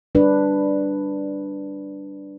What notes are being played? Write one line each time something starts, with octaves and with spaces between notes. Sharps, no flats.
G3 D4 B4